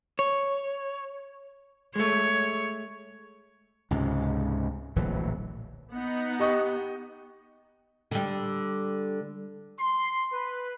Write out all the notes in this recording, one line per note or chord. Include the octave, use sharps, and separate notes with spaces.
C#5
G#3 A3 C#5
C#2 G#2 C3
D1 A#1 E3 F#3
B3 D#4 F#5
G4 D#5 C#6
D3 G3
C6
B4